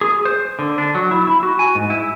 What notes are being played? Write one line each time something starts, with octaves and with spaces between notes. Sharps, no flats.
G#4
C5
D3
D4
F#3
E4
E4
F#4
G#5
G#2
E4